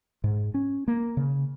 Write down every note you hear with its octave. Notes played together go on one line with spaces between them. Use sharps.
G#2
C#4
A#3
C#3